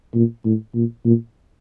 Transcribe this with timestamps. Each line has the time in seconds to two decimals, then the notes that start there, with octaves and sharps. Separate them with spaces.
0.15 A#2
0.45 A2
0.75 A#2
1.05 A#2